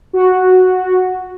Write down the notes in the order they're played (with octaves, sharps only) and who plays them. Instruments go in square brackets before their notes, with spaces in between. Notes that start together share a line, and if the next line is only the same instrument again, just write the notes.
[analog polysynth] F#4